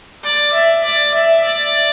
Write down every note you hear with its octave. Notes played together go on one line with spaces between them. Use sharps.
D5
E5
D5
E5
D5